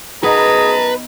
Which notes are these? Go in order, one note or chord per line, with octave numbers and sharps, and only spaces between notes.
F#2 B3 D#4 G#4 B4 A5 A#5